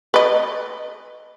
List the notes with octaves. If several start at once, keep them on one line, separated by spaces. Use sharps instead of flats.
B4 D#5